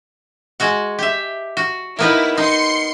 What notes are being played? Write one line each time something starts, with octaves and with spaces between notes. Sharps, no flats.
G#3 F#4 F#5
G4 E5
F#4
A#3 B3 D#4 E4
D#4 C6 C#7